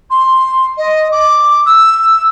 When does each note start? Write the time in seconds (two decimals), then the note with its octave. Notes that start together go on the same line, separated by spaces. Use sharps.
0.10 C6
0.77 D#5
1.11 D6
1.65 E6